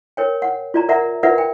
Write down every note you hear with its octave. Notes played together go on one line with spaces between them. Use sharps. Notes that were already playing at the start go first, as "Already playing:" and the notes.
A#4 C#5 G5
F#5
F4 D5 A#5
A#4 D5 E5 F#5 A#5
F4 A#4 B4 D5 E5 F#5
G5